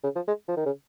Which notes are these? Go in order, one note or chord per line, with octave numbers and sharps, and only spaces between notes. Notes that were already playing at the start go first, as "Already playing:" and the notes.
C#3
F3
G#3
F3
D#3
C#3